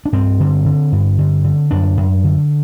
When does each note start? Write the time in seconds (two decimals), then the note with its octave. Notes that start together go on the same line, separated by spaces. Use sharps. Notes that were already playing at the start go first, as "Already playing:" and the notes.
0.05 D4
0.12 G2 C4
0.40 D3
0.65 D3
0.92 G2
1.18 D3
1.44 D3
1.71 F#2 D4
1.97 F#2
2.24 D3